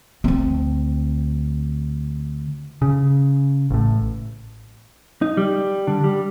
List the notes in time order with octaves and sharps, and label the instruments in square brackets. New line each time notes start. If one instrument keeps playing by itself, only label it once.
[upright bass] D2 C4
[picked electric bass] C#3
A1 A2
[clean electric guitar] D#4
G3
D3
G3